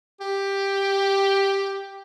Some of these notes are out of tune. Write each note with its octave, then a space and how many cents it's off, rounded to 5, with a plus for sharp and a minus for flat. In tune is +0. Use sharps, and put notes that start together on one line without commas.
G4 +5